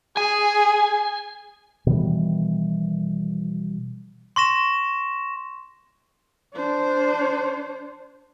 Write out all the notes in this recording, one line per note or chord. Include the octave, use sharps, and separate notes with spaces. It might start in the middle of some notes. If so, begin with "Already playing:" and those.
G#4 G#5
B2 D#3 E3 G3
C6 C#6 A#6 E7
D4 C5